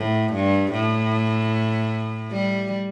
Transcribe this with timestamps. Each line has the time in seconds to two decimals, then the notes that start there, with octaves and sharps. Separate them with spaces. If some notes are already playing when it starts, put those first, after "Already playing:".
Already playing: A2
0.33 G2
0.72 A2
2.31 G3